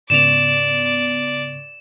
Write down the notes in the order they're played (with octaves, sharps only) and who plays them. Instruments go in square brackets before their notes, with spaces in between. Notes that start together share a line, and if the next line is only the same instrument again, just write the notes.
[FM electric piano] G#2 C#3 B3 [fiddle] D5 [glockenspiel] E7 F7